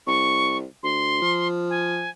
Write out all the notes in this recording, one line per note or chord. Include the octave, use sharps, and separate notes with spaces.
C2 C#6
D2 C6
F3
G#5